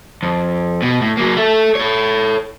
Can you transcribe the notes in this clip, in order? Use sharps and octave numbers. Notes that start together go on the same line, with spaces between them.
F2
B2
A2
F#3 A#3
A4 E5
A4 C#5